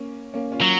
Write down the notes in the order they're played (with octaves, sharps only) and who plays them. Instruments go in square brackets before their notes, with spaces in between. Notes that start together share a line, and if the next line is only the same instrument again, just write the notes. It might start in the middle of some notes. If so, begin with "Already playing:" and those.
Already playing: [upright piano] A#3 C#4
A#3 C#4
C#4 F4
[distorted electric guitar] F#3